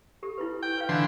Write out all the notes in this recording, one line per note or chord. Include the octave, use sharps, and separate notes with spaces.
G4 A4
E4 F4 B4
G5
B4 F5
D3 E3 C6